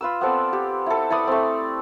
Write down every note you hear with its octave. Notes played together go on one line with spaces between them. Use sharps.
F4 B4 E6
B3 C4 A4 D5
G4
E4 A4
E4 B4 D5 D#6
A3 C4